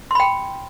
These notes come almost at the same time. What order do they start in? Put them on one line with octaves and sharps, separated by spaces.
C6 B5 G5